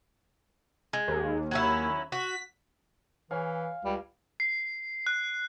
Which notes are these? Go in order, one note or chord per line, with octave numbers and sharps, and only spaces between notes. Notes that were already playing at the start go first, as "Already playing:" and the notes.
G#3
D#2
F#3 C#4 E4
F#4 B6
E3 C#5 F5 G#5
C#2 G3
C7
F#6